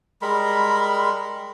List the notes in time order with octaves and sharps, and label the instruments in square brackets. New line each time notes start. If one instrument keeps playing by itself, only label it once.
[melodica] G3 G#3 A#4 B5